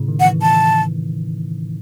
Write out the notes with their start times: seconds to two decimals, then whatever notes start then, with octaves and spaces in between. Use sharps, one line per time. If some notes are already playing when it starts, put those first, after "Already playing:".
Already playing: A2 C#3
0.08 D#3
0.20 F#5
0.25 E3
0.42 A5